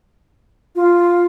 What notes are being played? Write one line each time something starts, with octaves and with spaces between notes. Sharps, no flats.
F4